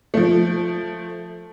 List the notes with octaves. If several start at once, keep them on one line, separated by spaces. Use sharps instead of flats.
F3 A3